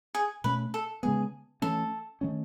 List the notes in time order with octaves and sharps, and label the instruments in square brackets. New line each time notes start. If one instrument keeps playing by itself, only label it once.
[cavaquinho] G#4
[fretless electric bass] B2 A3 C#4 [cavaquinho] B4
[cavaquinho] A4
[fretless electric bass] C#3 G#3 B3 [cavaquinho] G#4
[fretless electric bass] E3 A3 C#4 [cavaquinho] A4
[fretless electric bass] D#3 A3 C#4